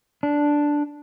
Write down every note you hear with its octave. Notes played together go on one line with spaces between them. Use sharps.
D4